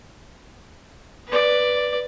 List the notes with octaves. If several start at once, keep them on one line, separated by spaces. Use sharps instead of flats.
B4 D5